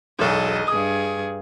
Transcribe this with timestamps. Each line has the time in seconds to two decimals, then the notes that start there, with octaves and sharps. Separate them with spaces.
0.19 E1 B1 A4 D#5
0.68 G2 G#4 D#6